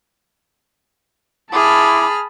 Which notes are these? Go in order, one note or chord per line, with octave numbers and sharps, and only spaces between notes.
E4 G#4 A5 B5 D6 F6